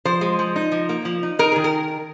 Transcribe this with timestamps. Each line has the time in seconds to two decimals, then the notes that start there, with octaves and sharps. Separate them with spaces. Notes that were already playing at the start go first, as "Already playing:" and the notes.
0.05 F3 C5
0.21 G#3
0.39 F3
0.56 D#4
0.72 F3
0.89 A#3
1.05 F3
1.23 D#4
1.39 D#4 A#4
1.52 D#3 G#4
1.64 A#4